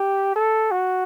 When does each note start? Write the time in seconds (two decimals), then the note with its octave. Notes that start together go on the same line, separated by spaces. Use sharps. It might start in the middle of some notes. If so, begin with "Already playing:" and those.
Already playing: G4
0.35 A4
0.71 F#4